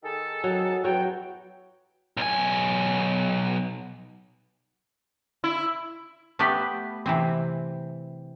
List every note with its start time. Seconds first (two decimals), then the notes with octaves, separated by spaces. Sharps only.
0.03 D#3 G#4 A4
0.44 F#3
0.84 E2 F#3 F#4 G5
2.17 B1 G#5
5.44 E4
6.39 A3 B3 G4 B4
7.06 C3 E3 C4